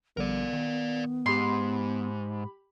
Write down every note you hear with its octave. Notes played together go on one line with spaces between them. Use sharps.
A#1 D3 G3 B3 A#4 D5
D#3
G#2 G4 B5 C6